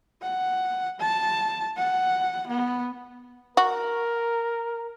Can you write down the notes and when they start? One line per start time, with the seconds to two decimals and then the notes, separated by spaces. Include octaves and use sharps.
0.22 F#5
1.01 A5
1.77 F#5
2.48 B3
3.57 F#4 A#4